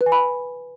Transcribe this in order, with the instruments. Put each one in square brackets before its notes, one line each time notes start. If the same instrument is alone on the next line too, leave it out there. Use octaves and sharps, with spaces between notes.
[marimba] B4
G#5
B5